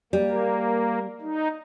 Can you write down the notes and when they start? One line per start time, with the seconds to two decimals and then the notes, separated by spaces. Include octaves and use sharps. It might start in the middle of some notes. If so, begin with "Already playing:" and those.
0.13 G3 A#3
1.21 D#4